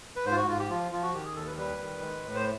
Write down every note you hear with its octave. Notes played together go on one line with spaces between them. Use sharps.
B4
G#2 C5
F4
F#4
G#2 F4
G4
F3 F4
F3 F4
F#4
D#3 G4
G#4
D#2 A4
B4
G3 B4
D#3
G#3
A2
C5